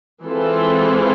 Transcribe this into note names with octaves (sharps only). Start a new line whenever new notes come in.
E3 G#3 C4 F4 A4